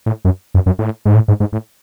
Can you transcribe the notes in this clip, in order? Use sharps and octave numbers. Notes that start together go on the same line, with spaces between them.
A2
F#2
F#2
F#2
A2
G#2
A2
G#2
G#2
A2